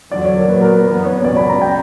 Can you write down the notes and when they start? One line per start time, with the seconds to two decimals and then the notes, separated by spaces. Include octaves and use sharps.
0.11 E2 D3 F#3 D5
0.24 C#5
0.37 A#4
0.48 A#2 F#3 B3 B4
0.61 A#4
0.74 B4
0.86 F#2 E3 B3 B4
1.05 C#5
1.24 C#2 B2 F#3 C#4 D5
1.37 B5
1.49 A#5
1.62 G5